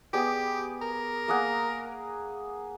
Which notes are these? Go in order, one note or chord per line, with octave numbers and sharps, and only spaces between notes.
B3 G4 G#4 D5
A#4
A#3 G#4 F#5